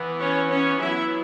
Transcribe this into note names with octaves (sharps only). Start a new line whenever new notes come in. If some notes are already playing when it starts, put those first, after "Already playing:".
Already playing: E3 B3
C#4 C#5
C#4 C#5
F#3 B3 E4 E5